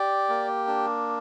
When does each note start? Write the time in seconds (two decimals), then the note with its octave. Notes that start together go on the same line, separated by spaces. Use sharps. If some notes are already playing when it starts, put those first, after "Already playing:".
Already playing: G4 D5
0.29 A#3
0.67 D4